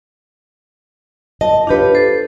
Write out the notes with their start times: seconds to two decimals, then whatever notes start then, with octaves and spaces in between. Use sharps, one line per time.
1.41 D#5 A5
1.67 D4 F4 G4 B4 C#5
1.95 A4 C5